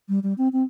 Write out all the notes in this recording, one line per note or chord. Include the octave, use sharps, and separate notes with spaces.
G3
G3
C4
C4